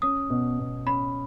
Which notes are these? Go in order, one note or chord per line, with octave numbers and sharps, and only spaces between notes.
C#4 D#6
B2
B2
C#4 B5